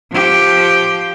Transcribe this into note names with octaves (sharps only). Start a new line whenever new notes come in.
F3 G4